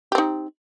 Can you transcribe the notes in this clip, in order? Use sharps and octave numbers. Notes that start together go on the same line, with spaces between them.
C4 D#4 G4